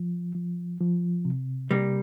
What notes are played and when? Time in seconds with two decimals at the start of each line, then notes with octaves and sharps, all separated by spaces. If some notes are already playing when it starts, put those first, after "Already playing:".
Already playing: F3
0.35 F3
0.81 F3
1.25 C3
1.71 C3 G3 A#3